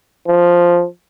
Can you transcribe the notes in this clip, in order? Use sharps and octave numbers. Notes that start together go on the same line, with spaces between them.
F3